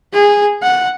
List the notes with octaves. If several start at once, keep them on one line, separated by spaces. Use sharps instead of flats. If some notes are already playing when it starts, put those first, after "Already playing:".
G#4
F#5